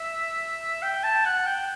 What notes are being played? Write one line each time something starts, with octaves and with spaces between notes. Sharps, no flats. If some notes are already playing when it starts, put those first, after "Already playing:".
Already playing: E5
G5
A5
F#5
G5